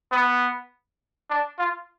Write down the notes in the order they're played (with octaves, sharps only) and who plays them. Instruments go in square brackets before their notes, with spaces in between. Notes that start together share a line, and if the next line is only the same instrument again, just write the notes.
[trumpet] B3
D4
F4